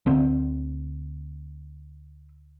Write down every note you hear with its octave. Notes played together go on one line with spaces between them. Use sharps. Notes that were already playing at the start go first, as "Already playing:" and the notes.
D2 D3 C4